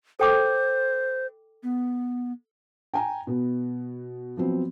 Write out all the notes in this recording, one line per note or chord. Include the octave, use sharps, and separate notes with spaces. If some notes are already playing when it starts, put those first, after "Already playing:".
A4 C5 G5 D6
B3
G5 G#5 A#5
B2 B3
F3 F#3 B3 C4